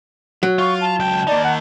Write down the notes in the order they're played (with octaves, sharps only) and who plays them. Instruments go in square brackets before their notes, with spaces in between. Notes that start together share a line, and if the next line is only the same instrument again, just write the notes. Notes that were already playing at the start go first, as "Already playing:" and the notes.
[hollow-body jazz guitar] F#3
[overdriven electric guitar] F4 [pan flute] C#6
[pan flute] A5
[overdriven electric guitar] C#2 G5
[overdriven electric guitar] A#3 D#4 [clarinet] D5
[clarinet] F#5